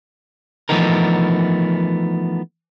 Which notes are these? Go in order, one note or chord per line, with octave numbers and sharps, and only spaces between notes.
E3 F3 A3 B3 D#4 A#4